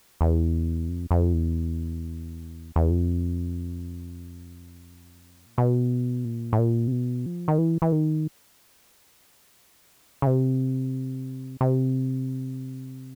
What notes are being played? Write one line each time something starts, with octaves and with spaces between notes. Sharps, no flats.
E2
F2
F2
E2
E2
F2
A#2
B2
A#2
A2
A#2
C3
B2
F3
D#3
E3
E3
D#3
C#3
C3
C3